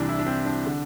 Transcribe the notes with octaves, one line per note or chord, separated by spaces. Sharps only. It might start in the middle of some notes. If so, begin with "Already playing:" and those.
Already playing: C2 C3 E3 D4
E4
D4
C4
D4
D3